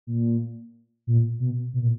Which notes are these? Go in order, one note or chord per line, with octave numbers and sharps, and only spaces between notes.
A#2
A#2
B2
B2
A#2